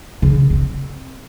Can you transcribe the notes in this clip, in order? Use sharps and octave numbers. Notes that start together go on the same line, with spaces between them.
C#3
C4